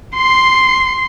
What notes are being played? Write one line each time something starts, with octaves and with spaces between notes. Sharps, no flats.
C6 C7